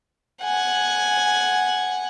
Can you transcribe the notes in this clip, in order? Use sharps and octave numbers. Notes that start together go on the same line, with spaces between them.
F#5 G#5